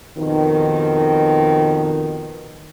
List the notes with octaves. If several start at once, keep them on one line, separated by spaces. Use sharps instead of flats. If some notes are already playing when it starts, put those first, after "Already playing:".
F2 B2 D#3